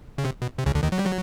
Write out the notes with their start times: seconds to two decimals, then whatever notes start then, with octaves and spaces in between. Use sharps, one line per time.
0.18 C#3
0.25 C3
0.42 B2
0.58 C3
0.66 C#2 C#3
0.74 D2 D3
0.83 D#2 D#3
0.92 F#3
0.99 G3
1.06 F#3